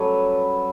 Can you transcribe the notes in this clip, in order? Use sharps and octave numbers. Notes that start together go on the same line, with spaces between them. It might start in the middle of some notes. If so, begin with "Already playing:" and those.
Already playing: G2 F#3 C#4 A4 B4 C#5